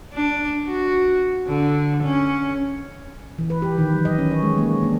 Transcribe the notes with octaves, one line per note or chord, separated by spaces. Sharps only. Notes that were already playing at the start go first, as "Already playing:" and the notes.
D4
F#4
D3
C#4
E3
B4
G4
D#3
F#3
D#5
C#4
C#5
G#3
A#3
D4